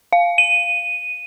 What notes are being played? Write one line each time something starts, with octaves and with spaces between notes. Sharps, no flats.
F5
D#7